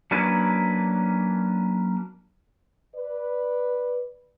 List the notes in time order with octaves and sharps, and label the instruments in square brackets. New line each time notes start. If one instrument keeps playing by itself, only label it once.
[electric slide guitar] F#3 A#3 C#4 D4 B4
[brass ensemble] B4 D5